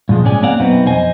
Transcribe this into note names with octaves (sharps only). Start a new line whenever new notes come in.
G2 A#2 F3 G#3
C#2 G#2 G#3 C#4 D5 G#5
A#3 C4 D5 F5 F#5
F#2 B2 B3 C4 D#4
F2 C5 D#5 G#5